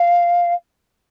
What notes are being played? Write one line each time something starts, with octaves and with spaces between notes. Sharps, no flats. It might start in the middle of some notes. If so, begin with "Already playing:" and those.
Already playing: F5